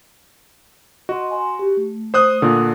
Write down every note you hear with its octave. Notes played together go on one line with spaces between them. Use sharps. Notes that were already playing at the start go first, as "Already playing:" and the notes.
F#4 D#5 C6
G#5 C6
G4
A3
C5 D#6 F#6
A#2 D3